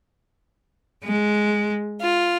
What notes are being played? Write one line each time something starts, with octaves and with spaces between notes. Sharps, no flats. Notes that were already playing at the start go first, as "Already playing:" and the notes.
G#3
F4